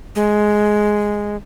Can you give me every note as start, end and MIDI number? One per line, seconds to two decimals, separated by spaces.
0.16 1.36 56